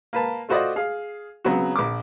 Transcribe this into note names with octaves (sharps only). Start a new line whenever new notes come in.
A#3 B4 A5
A3 F4 F#4 C5 D5 D#5
G#4 F5
C#3 F#3 B3 C4 F#4
A#1 D6